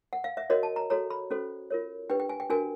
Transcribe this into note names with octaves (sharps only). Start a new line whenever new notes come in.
F#5
F5
E5
F#4 A#4 C#5 D#5
A5
A#5
F#4 A4 C#5 A#5
B5
C#4 F#4 A4 C5
F4 A#4 C#5
D4 G4 B4 G5
G5
G#5
G5
D4 F#4 A#4 G#5